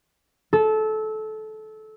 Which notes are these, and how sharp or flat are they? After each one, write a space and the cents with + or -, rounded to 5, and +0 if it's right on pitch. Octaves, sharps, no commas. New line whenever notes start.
A4 -20